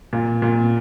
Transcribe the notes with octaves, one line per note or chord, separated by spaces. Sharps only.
A#2
A#2